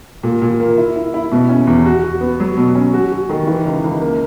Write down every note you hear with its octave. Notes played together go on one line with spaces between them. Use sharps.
A#2
A#2
A#3
E4
E4
E4
B2
C#4
E2
F#4
F#4
B3
F#3
B2
C#4
F#4
F#4
D#3
E3
C#2
C#2
A#3